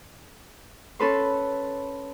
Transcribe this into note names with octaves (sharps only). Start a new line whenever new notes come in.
C#4 A4 B4 C6